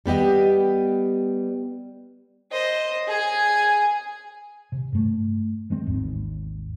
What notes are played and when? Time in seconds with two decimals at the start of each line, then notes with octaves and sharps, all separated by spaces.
0.06 G3 B3 G4 D#5
2.51 C5 D#5
3.07 G#4 G#5
4.72 C3
4.92 G2 A3
5.70 E3 G#3 C4
5.86 G#1 D#2 G#2